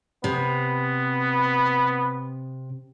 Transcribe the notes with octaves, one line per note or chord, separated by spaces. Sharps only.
C3 B3